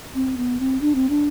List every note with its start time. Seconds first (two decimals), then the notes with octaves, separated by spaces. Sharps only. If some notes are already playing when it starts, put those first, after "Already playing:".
0.15 C4
0.37 B3
0.60 C4
0.81 D4
0.95 C4
1.10 D4